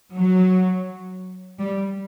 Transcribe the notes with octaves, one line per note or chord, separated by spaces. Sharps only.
F#3
G3